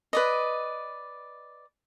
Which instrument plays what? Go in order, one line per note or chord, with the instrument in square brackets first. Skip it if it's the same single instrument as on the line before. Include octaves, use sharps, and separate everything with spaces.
[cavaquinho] B4 D5 D#5